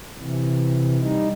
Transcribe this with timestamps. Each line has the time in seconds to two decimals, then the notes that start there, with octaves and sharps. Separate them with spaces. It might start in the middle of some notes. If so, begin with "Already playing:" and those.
0.19 C3 E3
1.00 G3 D#4